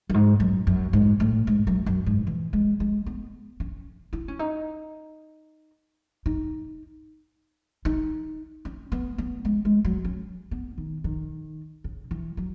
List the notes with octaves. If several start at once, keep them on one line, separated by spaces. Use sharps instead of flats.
F#2
G#2
F#2
F#2
G#2
A2
G#2
F#2
F#2
G#2
E3
G#3
G#3
B3
C#4
E4
C#4
D#4
D#4
D#4
C#4
B3
B3
G#3
G#3
F#3
C#4
B3
D#3
D#3
C#3
E3
F#3